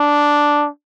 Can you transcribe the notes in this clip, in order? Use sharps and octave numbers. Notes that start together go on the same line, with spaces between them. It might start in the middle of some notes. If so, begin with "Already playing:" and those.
Already playing: D4